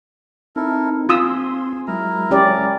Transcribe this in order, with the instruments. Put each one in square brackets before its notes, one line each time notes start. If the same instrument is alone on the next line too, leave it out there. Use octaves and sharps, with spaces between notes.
[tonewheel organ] C4 D#4 [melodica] E4 A4 A#4
[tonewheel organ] C4 C6 [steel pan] F4 D#6 E6 [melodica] G#4
[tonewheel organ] F#3 G#3 [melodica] E4 A#4 A#5
[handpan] C#4 G4 D5